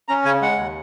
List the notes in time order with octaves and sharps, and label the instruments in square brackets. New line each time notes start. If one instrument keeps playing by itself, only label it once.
[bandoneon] C#4 A#5
C#3 G#5
G#3 F#5
D#2